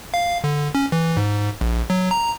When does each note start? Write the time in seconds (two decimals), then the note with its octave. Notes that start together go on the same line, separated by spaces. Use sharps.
0.14 F5
0.44 D3
0.75 C#4
0.92 E3
1.17 G#2
1.61 A#1
1.90 F#3
2.11 A#5